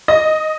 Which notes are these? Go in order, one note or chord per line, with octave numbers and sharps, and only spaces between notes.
D#5